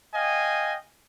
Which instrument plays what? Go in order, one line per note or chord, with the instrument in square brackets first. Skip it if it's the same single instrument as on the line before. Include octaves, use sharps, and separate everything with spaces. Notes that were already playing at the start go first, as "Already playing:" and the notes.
[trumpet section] D#5 F5 G5 G#5